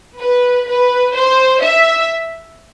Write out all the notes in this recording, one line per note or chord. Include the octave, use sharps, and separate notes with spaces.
B4
B4
C5
E5